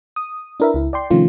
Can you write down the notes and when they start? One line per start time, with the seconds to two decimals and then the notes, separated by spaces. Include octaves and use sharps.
0.16 D#6
0.60 D4 E4 A#4 B4 E5
0.74 C#2 E4
0.93 D5 G5 C6
1.10 C3 D#3 F3 A3 C#4 F4